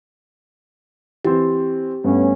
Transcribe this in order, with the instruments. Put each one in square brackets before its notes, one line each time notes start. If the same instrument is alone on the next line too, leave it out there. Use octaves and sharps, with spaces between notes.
[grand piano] E3 C4 [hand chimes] G4
[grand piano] G2 [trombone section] A3 B3 C#4